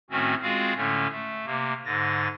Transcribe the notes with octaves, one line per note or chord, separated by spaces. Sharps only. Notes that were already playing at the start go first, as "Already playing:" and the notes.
A2 D#3 A3 C4 C#4 F#4
G#3 C4 F4 F#4 G#4 F5
A2 D3 A3 C#4
A3
C3 A#3
G#2 D3 A6 A#6